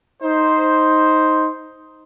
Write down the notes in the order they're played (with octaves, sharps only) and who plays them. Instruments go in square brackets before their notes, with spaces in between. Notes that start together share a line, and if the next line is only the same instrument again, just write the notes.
[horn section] D#4 C5